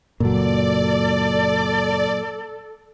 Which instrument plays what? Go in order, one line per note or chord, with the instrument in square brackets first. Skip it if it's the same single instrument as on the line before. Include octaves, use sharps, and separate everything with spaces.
[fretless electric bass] F#1 [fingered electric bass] A#2 F#3 [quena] A4 [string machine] D5